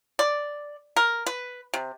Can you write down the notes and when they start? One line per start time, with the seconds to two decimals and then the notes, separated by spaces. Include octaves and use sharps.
0.19 D5
0.96 A#4
1.26 B4
1.74 C3